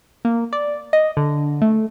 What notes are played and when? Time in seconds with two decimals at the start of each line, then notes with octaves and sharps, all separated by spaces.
0.25 A#3
0.53 D5
0.93 D#5
1.17 D3
1.62 A3